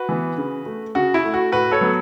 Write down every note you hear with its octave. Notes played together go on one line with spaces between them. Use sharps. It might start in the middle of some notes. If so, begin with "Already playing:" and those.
Already playing: F#4 B4
E3 B3
C#3
A3
C#3 F#4
E4
A3
F#4
A2 F#4 B4
A4 C#5
F#3 B3